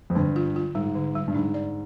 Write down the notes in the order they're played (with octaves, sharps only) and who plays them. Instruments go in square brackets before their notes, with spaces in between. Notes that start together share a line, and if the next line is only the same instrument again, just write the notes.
[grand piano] F2
[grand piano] G2 [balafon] D3
[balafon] F4
F4
[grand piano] G#2 [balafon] G3
[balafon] D3
G3
[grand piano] G2
[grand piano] G#2 [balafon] D4
[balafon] D5